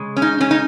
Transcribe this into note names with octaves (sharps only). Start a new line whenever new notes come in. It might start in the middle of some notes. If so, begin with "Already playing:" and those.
Already playing: C#3 G#3
C#4
D#4
C#4
D#4